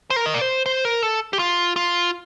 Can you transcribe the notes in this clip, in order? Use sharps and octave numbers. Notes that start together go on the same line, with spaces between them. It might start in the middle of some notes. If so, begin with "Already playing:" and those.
C5
A#4
D#5
D5
C5
C5
A#4
A4
G4
F4
F4